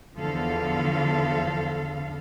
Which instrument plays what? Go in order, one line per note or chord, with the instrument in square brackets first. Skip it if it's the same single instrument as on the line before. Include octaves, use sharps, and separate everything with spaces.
[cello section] E2 D3 F3 A4 F5